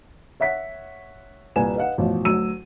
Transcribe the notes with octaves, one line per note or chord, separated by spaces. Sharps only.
C#5 E5 F#5 B6
C2 A#2 B4 G#5 E7
B4 D#5 F5 F#5
A1 B2 F3
D2 F#3 E6 D#7